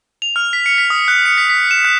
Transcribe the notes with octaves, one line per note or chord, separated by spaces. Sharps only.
F7
F6
B6
C#7
B6
D#6
F#6
C#7
B6
B6
E7
F#6